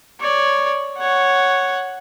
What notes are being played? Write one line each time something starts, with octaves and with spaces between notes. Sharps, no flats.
C#5 D5
C#5 F#5